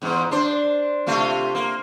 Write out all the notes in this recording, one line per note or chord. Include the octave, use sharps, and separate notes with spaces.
E2 G#2
D4 C5
C3 A3 F4
A#3